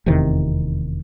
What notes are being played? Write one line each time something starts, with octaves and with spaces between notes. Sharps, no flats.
F1 E2 C3 D#3